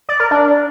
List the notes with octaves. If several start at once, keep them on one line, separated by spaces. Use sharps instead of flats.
D5
A#4
D4